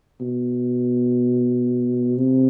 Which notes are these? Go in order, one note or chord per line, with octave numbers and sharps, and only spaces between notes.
B2
C3